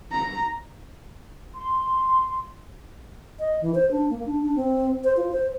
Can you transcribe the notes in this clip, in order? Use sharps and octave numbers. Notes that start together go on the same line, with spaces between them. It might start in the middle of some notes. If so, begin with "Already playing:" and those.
A#5
C6
D#5
E3
C5
D4
A#3
D4
D4
C4
C5
F4
C5